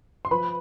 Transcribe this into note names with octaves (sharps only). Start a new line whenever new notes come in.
C6
F3 B4 B5